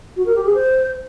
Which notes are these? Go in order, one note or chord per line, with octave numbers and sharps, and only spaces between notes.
F#4
A#4
G4
G#4
C5